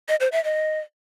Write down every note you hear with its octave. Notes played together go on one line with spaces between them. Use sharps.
D#5
C5
E5
D#5